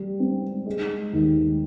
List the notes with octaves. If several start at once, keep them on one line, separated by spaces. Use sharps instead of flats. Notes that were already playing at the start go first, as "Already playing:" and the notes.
Already playing: G3
C4
G#3
D#2